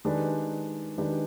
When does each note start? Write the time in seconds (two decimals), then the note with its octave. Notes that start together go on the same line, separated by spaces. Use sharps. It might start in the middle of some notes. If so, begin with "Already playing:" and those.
0.05 D#3 G#3 D4 G4 B4
0.98 D#3 G#3 D4 G4 B4